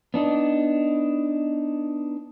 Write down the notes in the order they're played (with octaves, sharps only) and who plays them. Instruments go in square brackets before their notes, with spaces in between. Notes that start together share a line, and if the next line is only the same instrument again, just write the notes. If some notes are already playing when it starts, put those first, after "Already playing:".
[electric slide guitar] B3 D4 D#4